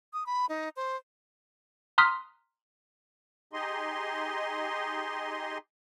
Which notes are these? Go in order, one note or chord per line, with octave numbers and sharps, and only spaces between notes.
D#6
B5
D#4
C5
A#5 C6 D#6 F6 F#6 B6
D#4 G4 G#4 D#5 C6